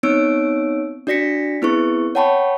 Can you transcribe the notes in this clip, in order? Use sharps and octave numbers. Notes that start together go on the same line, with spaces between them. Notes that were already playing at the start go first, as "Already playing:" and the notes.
B3 C4 D#4 C#5 E6 D7
D4 F#4 D5 A#6 B6 C#7
B3 C4 E4 G#4 B4 C#6
C#5 F#5 G5 A5 B5 C#6